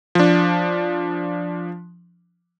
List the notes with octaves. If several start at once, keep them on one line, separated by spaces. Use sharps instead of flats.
F3 D4